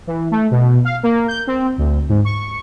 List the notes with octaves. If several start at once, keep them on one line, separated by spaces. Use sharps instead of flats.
E3
A3
B2
F5
A#3
G6
C4
D2
G#2
C#6